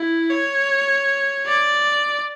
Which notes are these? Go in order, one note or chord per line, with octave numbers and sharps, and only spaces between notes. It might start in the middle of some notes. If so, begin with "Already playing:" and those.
Already playing: E4
C#5
D5